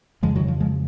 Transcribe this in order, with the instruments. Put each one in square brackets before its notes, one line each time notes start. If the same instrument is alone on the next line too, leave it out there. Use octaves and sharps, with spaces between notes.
[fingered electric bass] F2 C#3 F3 G#3
D#3 F#3
F3
F3 G#3